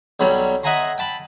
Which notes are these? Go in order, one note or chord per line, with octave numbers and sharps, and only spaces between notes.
B1 F#3 G3
D#5 E5 F#5 G#5 A#5 C6
G5 A5 B5